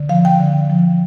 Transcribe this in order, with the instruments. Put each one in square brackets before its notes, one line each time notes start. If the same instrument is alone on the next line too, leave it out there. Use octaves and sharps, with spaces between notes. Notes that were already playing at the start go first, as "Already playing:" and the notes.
Already playing: [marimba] D3
F3 F5
G5
D3
F3